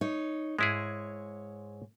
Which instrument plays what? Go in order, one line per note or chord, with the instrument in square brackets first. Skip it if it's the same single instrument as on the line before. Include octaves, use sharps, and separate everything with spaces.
[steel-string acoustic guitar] D#4 C#5
[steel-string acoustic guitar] G#2 C#5 [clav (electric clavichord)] G#3 E4 G#4